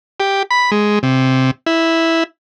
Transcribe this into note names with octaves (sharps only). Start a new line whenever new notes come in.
G4
B5
G#3
C3
E4